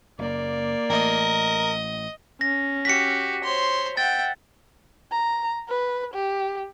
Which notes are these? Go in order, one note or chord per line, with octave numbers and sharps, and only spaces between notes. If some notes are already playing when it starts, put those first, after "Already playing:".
F#1 A#3 D5
A1 A#4 D#5
C#4 A#6
F#4 G4 B6 C#7
C5 C#5 C6
E5 F#5 G5 A6
A#5
B4
G4